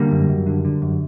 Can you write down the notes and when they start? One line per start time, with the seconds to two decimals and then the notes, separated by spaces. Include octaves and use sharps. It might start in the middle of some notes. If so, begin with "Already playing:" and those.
Already playing: D3 G3 A#3
0.11 F#2
0.29 F#2
0.46 D3
0.65 D3
0.82 F#2